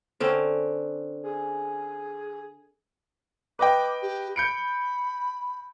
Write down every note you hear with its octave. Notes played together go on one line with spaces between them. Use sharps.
D3 C4 C#4
G#4
B4 D#5 G5 D6
G4
B5 G6 C#7 D7